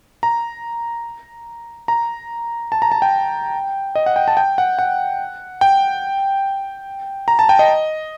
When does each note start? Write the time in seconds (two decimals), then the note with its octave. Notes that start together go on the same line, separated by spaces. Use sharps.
0.23 A#5
1.88 A#5
2.72 A5
2.82 A#5
2.92 A5
3.02 G5
3.95 D#5
4.06 F#5
4.16 G5
4.28 A5
4.37 G5
4.58 F#5
4.79 F#5
5.61 G5
7.28 A#5
7.39 A5
7.49 G5
7.59 D#5